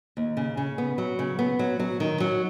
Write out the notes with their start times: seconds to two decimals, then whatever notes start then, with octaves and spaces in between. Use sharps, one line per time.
0.17 D#2
0.37 C#3
0.57 C#3
0.78 B3
0.98 F#3
1.19 C#3
1.39 B3
1.59 F#3
1.80 F#3
2.00 D#3
2.20 F#3